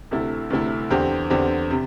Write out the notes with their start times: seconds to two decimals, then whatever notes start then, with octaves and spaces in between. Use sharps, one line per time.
0.11 D2 C3 A3 E4
0.50 D2 C3 A3 E4
0.90 E2 D3 C4 G4
1.30 E2 D3 C4 G4
1.71 C3